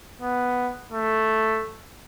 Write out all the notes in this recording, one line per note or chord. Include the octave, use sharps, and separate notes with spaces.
B3
A3